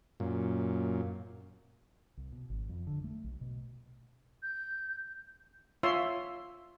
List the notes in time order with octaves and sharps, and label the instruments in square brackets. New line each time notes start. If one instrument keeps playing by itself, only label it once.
[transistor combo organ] F#2 A#2
[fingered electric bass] C2
B2
G#1
F2
D3
A3
B1
B2
[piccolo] G6
[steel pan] F4 C#5 E5 C6 E6